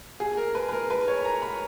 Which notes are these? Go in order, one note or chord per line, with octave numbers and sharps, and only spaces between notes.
G#4
A#4
B4
B4
A#4
B4
C#5
A#5
B5